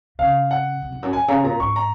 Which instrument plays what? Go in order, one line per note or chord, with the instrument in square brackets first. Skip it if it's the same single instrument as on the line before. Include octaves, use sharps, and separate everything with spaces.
[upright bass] C#3 [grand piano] F5
[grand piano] F#5
[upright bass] C3
F2
F#2
[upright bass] A#2 [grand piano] G#5
[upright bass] C#3 [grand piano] A#5
[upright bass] A#2 [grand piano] A#5
[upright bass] G#2 [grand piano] C#6
[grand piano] A#5